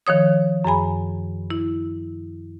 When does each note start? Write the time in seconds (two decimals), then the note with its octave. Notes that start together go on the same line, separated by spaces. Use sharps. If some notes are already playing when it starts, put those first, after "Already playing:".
0.07 D#3 F3 C#5 D#6
0.64 F#2 G#4 G#5 B5
1.50 E4